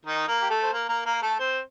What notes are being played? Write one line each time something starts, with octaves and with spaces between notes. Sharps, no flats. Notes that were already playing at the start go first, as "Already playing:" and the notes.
D#3 D#4
A#3 A#4
G4
A3 A4
C5
A#3 A#4
A#3 A#4
A#3 A#4
A3 A4
C4 C5